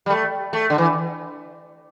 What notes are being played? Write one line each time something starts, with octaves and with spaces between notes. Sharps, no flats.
G3
A3
A3
D3
E3